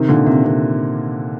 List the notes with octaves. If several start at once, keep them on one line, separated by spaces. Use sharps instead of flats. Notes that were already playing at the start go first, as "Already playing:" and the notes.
Already playing: C3 D#3
A#2 D3
C3
C3